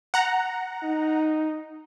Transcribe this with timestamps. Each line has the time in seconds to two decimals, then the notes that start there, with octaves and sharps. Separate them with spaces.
0.14 F#5 A#5
0.83 D#4